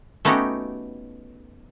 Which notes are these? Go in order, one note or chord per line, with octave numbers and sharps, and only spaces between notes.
A3 B3 C#4 D#4 F#4 G4